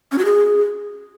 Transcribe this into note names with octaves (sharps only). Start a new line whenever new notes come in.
C#4
F#4
G#4